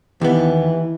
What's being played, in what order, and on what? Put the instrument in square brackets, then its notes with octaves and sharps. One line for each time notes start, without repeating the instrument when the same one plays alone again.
[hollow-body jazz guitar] D#2 B3 [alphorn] E3